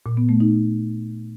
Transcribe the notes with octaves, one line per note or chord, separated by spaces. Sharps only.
A#2
B3
A3
D#4